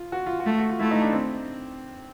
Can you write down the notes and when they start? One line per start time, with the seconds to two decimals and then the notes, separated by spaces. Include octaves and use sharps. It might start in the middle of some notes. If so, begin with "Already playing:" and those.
Already playing: F4
0.12 F#4
0.26 F4
0.40 F#4
0.46 A3
0.58 F#4
0.69 F4
0.79 A3 E4
0.91 D#4
1.02 D4
1.12 C4